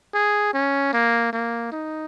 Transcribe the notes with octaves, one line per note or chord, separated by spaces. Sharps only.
G#4
C#4
A#3
A#3
D#4